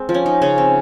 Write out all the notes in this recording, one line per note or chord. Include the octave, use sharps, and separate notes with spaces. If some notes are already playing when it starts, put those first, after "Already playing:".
Already playing: G#3 C4
F3
C#4
D#4
C#3 C#4
C4